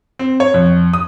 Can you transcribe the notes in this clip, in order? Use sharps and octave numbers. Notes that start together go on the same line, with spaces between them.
C4
C#5
F2
D#6